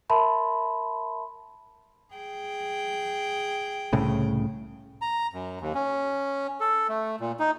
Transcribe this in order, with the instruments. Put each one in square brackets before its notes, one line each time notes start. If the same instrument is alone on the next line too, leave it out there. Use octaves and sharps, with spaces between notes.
[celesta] A#4 E5 A5 B5 C6
[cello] G#4 G5
[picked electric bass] C2 A2 C#3
[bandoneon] A#5
F#2
D#2
C#4
A4
A3
A#2
D#4